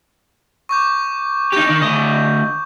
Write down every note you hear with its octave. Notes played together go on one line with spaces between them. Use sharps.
C#6 D6 G6
D#4 G4 G6
D#3 D#4
D2 D#5